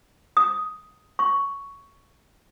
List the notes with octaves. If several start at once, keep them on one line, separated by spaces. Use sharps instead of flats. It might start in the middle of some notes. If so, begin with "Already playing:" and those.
D#6
C#6